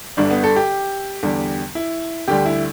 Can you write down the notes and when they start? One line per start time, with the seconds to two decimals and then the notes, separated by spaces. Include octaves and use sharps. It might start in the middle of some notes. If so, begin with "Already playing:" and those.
0.17 G1 G2 D3 G3 D4
0.31 B3
0.44 A4
0.56 G4
1.23 E2 D3 G3
1.75 E4
2.28 D2 D3 G3 G4
2.45 E4